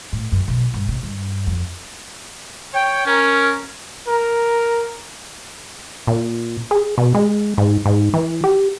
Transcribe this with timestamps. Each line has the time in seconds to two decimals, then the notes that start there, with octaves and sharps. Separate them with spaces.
0.12 A2
0.32 F#2
0.48 B1
0.74 G2
0.88 C3
1.03 G2
1.47 F2
2.73 C#5 G5
3.06 C#4 A#4
4.07 A#4
6.07 A#2
6.71 G#4
6.98 B2
7.14 G#3
7.58 G#2
7.86 G#2
8.14 E3
8.44 G4